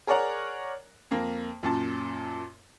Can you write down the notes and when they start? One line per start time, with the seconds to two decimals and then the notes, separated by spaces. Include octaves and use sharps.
0.07 G#4 A#4 C#5 D5 F#5 A#5
1.11 F2 A#3
1.63 F#2 A#2 A5